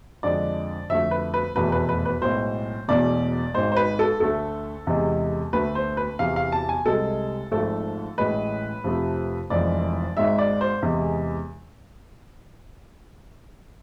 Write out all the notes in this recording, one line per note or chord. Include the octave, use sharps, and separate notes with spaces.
F2 D3 G#3 D5
F2 D3 A3 E5
B4
B4
F1 E2 B2 A3 B4
B4
B4
B4
B1 A2 G#3 C5
E1 E2 B2 A3 D5
G#1 G#2 G#3 C5
C5
B4
A4
D2 D3 A3 A4
E2 C3 G#3
D2 D3 A3 B4
C5
B4
E2 C3 E3 F5
F5
A5
G#5
C2 C3 G#3 A4
G#1 G#2 F3 A3 A4
A1 A2 G#3 B4
F2 C3 F3 A3
F1 F2 E3 G#3 D5
G#1 G#2 G#3 E5
D5
C5
E2 C3 E3 G#3